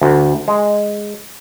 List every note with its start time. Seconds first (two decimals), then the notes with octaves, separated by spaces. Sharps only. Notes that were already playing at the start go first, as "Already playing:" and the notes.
0.02 D2
0.48 G#3